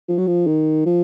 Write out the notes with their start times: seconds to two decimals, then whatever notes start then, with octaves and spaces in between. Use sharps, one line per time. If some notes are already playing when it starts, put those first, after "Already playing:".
0.09 F3
0.18 F#3
0.27 F3
0.47 D#3
0.86 F3